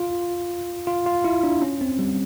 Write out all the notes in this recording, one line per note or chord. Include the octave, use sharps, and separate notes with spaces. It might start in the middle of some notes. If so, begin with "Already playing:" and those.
Already playing: F4
F4
F4
E4
D4
C#4
C4
G3